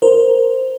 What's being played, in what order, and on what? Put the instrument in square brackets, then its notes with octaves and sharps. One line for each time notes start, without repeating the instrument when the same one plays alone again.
[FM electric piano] A#4 C5